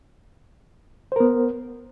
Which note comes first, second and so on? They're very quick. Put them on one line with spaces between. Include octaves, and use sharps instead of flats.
C5 A#4 B3